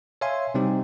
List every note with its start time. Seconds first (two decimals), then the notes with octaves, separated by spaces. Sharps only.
0.21 C#5 E5 F5 G#5 C6
0.54 C3 G3 C4 D#4 G4